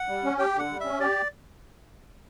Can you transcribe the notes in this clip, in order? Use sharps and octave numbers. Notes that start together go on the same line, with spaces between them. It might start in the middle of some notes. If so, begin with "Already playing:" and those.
Already playing: F#5
G3
C#4
G4 G5
D3 F#5
G3
C#4 E5
G4 D5